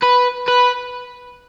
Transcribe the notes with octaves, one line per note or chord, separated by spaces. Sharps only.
B4
B4